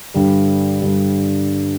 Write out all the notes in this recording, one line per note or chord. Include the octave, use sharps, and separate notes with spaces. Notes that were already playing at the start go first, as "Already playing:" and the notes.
G2 D3 G3
G2 D3 G3